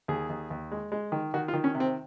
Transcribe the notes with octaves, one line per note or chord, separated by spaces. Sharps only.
D#2 G#4
D#2
D#2
G#3
G#3
D#3
D#3 F#4
F4
D#3
C#4
C3
C4